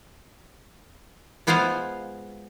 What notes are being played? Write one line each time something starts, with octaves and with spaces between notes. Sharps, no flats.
G#3 B3 F4 G#4 C5 F5